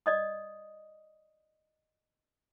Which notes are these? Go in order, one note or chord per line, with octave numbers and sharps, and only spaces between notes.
D5 D#5 D#6